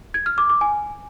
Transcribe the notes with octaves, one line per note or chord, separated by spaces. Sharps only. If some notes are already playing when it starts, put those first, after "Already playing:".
G#6
F6
D6
D6
G#5